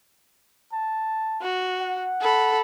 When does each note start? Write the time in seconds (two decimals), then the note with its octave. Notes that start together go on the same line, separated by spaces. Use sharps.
0.73 A5
1.41 F#4
1.82 F#5
2.21 A4 B5